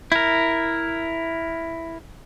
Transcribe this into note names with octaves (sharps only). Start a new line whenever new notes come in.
E4 A#4